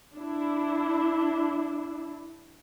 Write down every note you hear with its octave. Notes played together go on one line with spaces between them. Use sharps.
D4 E4